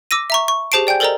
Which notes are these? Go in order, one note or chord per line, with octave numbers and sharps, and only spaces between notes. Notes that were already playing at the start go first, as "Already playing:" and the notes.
D6 E6 A#6 D#7
E5 A#5 C#6
C#6
G4 G#4 C5 A5 C7 D7
D5 G5 G#5 G6
A4 A#4 C5 D5 D#5 A#5